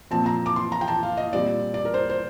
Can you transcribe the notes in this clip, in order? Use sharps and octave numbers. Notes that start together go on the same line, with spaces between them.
A#2 F3 C4 A5
A#5
D6
C6
A#5
G5
A5
F5
D#5
A#2 G3 C4 D5
D5
A#4
C5
C5